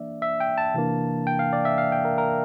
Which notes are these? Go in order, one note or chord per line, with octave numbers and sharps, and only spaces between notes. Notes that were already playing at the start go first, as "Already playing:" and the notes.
Already playing: E3 A#3 D4 D5 E5
E5
G5
A5
C3 E3 A#3 D4
G5
F5
D5
E5
F5
G5
A#4
A#4